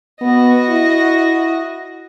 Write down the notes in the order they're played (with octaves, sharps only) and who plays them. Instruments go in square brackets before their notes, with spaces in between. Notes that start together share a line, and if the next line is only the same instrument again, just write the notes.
[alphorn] B3 [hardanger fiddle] F#4 D#5
[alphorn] E4